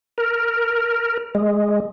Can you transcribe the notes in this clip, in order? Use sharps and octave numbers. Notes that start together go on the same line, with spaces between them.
A#4
G#3